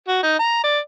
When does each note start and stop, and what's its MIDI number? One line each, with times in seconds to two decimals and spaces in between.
0.08 0.19 66
0.23 0.39 63
0.39 0.63 82
0.64 0.79 74